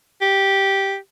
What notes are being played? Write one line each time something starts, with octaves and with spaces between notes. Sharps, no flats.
G4